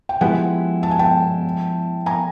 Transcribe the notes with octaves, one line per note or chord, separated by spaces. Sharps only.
G5
F3 G#3 B3 E4 G4 F#5 G#5
A5
G#5
G5 A5
G#5 A#5